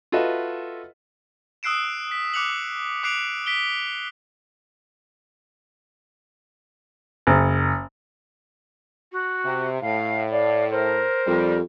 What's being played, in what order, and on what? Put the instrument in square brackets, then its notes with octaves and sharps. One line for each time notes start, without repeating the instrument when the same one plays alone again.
[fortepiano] F4 F#4 A4 B4 D#5 E5
[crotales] D#6 E6 F#6 C7 D7 E7
B6
D6 F#6 C#7 F7 F#7
D6 F#6 C7 D7 F7
B6 D7 G7
[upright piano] F#1
[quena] F#4
[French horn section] C3
[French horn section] A2 [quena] F5
[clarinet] D5 [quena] F5
[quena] A#4 [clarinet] C5
[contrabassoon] F2 [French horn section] G3